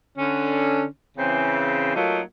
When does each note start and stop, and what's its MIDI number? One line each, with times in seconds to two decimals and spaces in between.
0.17 0.85 50
0.17 0.85 61
1.18 1.94 49
1.18 1.94 52
1.18 1.94 60
1.95 2.20 54
1.95 2.20 57
1.95 2.20 58
1.95 2.20 63
1.95 2.20 65
1.95 2.20 66